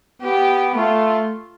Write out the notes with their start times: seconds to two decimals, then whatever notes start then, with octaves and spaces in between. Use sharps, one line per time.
0.22 B3 G4
0.75 A3 F4